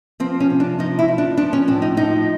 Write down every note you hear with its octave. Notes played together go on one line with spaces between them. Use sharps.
F3 C4
C#4
C3
D4
F3 D#4
E4
F3
D4
F3 D4
C#4
A2 D4
D#4
F3 D#4